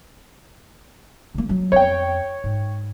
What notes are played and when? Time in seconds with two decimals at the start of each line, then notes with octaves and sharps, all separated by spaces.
1.34 D3 A#3
1.49 F#3
1.72 F2 C#5 G5
2.44 G#2